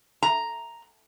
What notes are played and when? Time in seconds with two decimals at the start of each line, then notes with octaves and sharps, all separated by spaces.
0.23 A#5